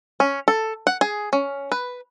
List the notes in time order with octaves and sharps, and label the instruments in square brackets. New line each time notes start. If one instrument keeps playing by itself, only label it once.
[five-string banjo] C#4
A4
F#5
G#4
C#4
B4